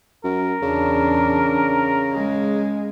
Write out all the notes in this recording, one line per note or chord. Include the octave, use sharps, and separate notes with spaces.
F#2 A#4
E2 C#3 D4
G#3